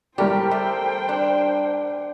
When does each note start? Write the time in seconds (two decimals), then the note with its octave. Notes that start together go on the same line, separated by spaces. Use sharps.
0.18 A2 G3 G4 A#4 C5 D5 G5
0.51 A3
1.09 D4